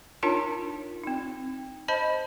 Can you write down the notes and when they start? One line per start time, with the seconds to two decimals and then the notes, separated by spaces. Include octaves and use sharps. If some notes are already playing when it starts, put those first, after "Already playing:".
0.23 D4 D#4 F4 A#4 C#5 A5
1.04 C4 D#4
1.88 C5 D#5 A5 B5